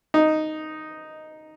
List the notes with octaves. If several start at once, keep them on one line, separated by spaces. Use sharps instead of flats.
D#4